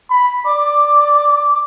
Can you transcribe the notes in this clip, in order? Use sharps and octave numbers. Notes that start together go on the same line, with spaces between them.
B5
D5 D6